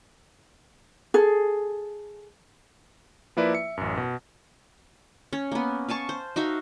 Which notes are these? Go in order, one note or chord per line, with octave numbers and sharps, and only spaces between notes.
G#4 A4
F3 A#3 E4 B4 D5
E5 C#7
A1 F#2
B2
C#4 C#5
A#3 B3
F5 G#5 A5 C#6
C5
D#4 F#4 E5 F5